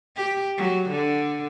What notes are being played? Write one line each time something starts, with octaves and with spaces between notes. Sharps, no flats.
G4
F#3
D3